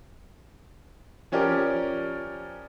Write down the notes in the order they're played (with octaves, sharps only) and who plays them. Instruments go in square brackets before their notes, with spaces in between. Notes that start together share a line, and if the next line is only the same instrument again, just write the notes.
[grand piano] F3 C#4 G4 A#4 D5